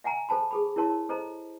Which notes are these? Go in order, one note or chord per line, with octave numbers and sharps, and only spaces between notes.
E5 F#5 G#5 A#5
A4 C5 A5 B5
G#4 A4 B5
E4 A#4 C#5 A5 C6
A4 C5 D#5 A#5